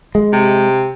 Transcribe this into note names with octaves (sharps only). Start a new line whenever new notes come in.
G#3
C3